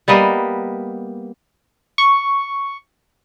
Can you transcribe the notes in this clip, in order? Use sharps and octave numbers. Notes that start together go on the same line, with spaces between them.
G3 A#3 B3 D#5
C#6